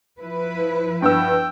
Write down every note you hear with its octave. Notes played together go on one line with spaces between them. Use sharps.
F3 E4 B4
G2 B3 G5 E6